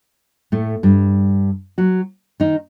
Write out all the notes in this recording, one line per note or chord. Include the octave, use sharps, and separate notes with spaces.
A2 A3
G2 G3
F#3 F#4
D#3 D#4